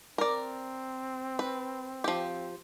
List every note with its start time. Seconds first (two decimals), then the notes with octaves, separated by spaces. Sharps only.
0.18 C4 A#4 D5
1.39 B4
2.04 F3 G4